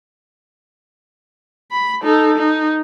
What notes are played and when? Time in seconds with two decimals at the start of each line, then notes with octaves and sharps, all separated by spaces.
1.71 B5
2.03 D#4 A4
2.38 D#4